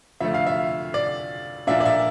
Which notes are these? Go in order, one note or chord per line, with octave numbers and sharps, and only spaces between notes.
F2 D3 F3 A3 E5
F5
E5
D5
A#2 F3 A#3 D4 E5
D5
E5